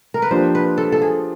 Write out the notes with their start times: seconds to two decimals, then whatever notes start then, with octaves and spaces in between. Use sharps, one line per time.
0.14 A#4
0.22 B4
0.31 F3 A#3 D4 G4 C5
0.55 B4
0.78 A4
0.92 A4
1.02 G#4